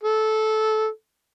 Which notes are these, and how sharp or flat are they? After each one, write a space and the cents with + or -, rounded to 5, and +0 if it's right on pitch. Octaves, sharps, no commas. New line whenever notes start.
A4 -15